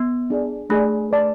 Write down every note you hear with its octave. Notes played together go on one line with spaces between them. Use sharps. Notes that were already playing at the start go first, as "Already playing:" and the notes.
Already playing: B3
D4 G#4 D5
A3 D4 G#4 D5
B4 D5 A5